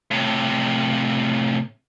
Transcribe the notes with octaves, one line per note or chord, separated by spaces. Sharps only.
A2 C3